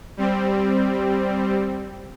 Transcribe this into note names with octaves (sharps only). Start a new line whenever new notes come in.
G3 C4